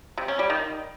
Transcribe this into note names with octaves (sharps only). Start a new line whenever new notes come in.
C3
C#4
G3
D#3